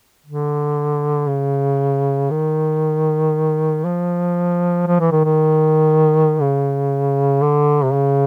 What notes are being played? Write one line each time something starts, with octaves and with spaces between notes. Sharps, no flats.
D3
C#3
D#3
F3
F3
E3
D#3
D#3
C#3
D3
C3
C#3